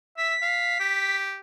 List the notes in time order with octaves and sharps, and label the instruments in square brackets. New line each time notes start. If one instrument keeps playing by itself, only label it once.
[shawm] E5 [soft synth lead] B6
[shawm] F5
G4